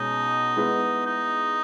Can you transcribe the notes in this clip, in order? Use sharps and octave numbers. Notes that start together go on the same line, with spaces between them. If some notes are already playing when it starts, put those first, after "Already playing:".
Already playing: B2 G#3 C#4 D#4 G#4 C#5
G#3 B3 E4 B4
D#4